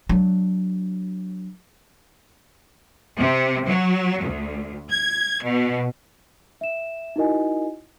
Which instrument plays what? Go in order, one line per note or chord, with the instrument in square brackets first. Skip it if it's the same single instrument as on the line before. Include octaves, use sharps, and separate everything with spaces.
[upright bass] F#3 D4
[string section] C3
F#3
D2
G#6
B2
[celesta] E5 E7
D#4 E4 F#4 A#4 D#5 G#5